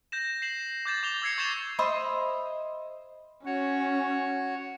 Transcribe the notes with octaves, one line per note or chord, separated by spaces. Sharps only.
G6 A#6 E7
C7 E7 F#7
D6 G6 A6 E7
D6 F7 G7
D6 E6 G#6 C7 C#7
C#6 G6 A6 C7 E7 F7
C5 D#5 E5 B5
C#4 F#4 C#5